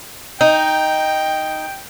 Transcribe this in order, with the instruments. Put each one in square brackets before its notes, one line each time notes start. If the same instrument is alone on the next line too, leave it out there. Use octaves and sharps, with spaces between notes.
[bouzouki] D#4 [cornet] G5